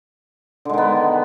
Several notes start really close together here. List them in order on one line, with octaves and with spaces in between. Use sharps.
D3 G#3 D#3 B3